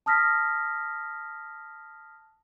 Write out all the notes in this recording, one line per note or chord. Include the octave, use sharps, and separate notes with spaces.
A5 D#6 F6 A#6 B6